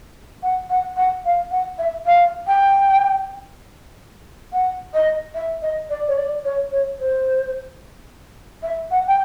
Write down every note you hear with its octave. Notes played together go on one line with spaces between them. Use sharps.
F#5
F#5
F#5
F5
F#5
E5
F5
G5
F#5
D#5
E5
D#5
D5
C#5
D5
C#5
C#5
C5
E5
F#5
G5